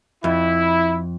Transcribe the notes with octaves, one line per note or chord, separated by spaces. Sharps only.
F2 E4